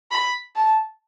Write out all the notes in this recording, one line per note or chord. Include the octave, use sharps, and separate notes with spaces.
B5
A5